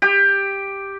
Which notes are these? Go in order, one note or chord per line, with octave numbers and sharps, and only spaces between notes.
G4